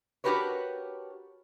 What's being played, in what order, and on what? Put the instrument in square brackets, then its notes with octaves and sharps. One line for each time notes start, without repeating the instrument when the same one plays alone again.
[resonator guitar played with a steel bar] D4 F#4 G4 A#4 B4 C#5